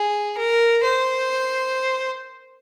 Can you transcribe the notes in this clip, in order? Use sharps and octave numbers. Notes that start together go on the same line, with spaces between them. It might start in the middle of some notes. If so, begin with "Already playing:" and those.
Already playing: G#4
A#4
C5